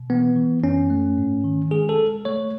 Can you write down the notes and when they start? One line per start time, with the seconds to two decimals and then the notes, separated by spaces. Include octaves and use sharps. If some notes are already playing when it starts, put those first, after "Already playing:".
Already playing: B2
0.10 E3 B3
0.36 E3
0.63 F#2 C#4
0.90 A3
1.18 G#2
1.44 D#3
1.71 G#3 G#4
1.89 A4
1.98 G#3
2.25 A3 C#5